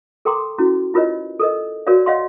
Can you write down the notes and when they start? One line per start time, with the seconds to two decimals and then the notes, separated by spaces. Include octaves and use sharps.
0.25 A4 A#4 G5 A#5 C6 D6
0.58 C#4 E4 F#4
0.94 E4 F4 A#4 B4 C#5 D#5
1.40 A4 A#4 D#5
1.87 F#4 A#4 C#5 D5 F5
2.06 C#5 D#5 F5 F#5 C6